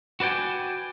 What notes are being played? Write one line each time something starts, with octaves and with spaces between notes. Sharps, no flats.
F#4 B4 D5 G5 G#5